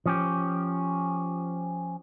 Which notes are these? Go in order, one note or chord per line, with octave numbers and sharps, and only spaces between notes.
F3 C#4 G4